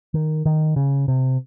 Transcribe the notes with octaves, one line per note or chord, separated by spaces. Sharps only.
D#3
D#3
C#3
C3